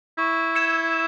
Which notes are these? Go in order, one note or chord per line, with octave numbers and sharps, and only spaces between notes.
E4 C#6
E6 G#6 C#7 E7